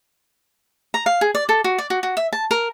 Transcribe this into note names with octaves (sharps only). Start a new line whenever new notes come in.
A#5
F5
G#4
D5
A4
F#4
D5
F#4
F#4
E5
A5
A#4